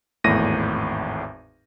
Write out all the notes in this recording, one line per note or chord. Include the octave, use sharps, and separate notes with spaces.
G#1 E2 A2 A#6 D#7